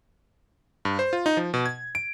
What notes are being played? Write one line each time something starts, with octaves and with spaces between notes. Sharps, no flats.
G2
C5
F4
D#4
F3
B2
G#6
D7